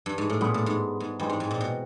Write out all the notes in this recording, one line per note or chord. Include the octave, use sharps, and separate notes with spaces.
G2
G#2
A2
A#2 G3 B3 D4 F4 G#4
A2
G#2
G#2
G2 E3 G#3 C4
G#2
G#2
A#2
B2